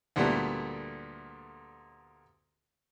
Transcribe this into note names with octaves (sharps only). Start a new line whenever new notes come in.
D2 A#2 G3 A3 B3